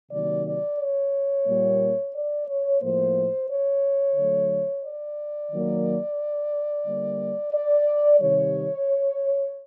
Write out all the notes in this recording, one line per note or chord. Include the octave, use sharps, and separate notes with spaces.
C3 D#3 F#3 A#3 D5
D5
C#5
A#2 G3 A#3
D5
C#5
A2 F3 A#3 C5
C#5
D3 F#3 A3
D5
D#3 F#3 A#3
D3 G3 A#3
D5
C3 D#3 G3 C#5